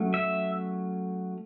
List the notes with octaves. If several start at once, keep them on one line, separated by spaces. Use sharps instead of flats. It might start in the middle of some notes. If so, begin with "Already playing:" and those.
Already playing: F#3 A3 C#4
E5